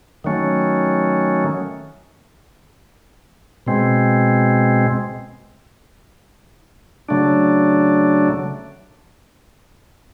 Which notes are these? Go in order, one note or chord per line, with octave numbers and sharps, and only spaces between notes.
D#3 F#3 A3 C#4
B2 G#3 C4
C#3 F#3 A3 D4